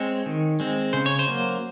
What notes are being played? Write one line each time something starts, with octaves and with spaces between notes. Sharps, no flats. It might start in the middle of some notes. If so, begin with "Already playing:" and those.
Already playing: G#3 C4 C#5
D#3
G#3 C4
C#3 C5
C#5
C5
F#3 A#3